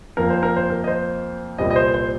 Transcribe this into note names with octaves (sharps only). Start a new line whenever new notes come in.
F2 F3 A#3 A#4
C5
A#4
C5
A#4
D#5
C5
C2 A#2 G3 C4 D#5
D#5
C5
C5